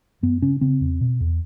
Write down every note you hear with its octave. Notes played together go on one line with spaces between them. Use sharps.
F#2 B3
C#3 C#4
C#3 C4
E2
B2
E2